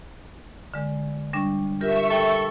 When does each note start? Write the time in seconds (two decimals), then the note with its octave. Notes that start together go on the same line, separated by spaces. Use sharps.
0.74 D3 G#3
1.33 G3 D4 C#6
1.81 F4 G4 A#4 E5 C#6
2.10 A4 G5